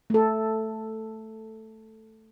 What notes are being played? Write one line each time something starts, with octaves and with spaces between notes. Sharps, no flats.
A3 A4